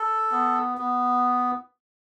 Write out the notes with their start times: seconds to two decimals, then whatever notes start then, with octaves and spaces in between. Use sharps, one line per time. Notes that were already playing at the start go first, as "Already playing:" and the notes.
Already playing: A4
0.31 B3
0.78 B3